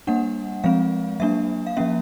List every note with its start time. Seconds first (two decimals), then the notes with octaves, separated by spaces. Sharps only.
0.07 G3 A#3 D4 F#5
0.64 F3 G#3 C4 F5
1.20 F#3 A#3 D4 E5
1.67 F5
1.77 F3 A#3 C#4 E5